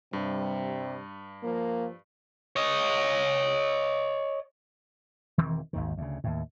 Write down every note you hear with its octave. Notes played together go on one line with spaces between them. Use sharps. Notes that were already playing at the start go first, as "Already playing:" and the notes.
G2 C3 G3
F3 A#3
C#5 D#5
E1 D#3 E3 C4
G#1 D#2 D#3
D2 C#3
D#2 A2